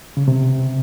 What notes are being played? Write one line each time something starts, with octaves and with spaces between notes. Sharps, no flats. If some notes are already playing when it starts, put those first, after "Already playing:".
C#3
C3